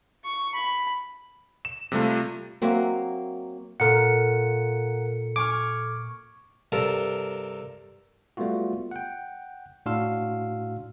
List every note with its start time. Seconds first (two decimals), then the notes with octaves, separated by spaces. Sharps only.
0.25 C#6
0.55 B5
1.65 E7
1.92 C3 G3 A3 F4
2.62 F#3 A#3 C4 E5
3.80 A#2 A4 A#4 F#5 C#7
5.36 G#5 C#6 D6 F6
6.72 G2 C3 A4 A#4
8.37 G3 A3 B3 F4 F#4
8.91 F#5 G5
9.86 A2 D4 F#4 F5 C6 E6